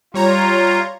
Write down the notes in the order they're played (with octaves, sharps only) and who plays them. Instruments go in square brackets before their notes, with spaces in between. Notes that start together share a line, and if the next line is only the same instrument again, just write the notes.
[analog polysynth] G3 C#5 A#5 [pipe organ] F4